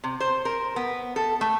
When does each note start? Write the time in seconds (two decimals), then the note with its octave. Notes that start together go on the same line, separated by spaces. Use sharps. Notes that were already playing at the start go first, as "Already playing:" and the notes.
0.04 C3
0.20 C5
0.45 A#4
0.76 B3
1.16 A4
1.41 A3